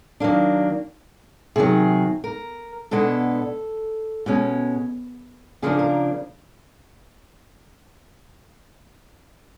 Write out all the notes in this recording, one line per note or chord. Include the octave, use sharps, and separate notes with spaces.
D#3 F#3 A#3 D4
C3 D#3 F#3 G#4
A#4
B2 G#3 B3 D4 A4
B2 G#3 C#4
C#3 F3 A#3 D4 G#4
A#4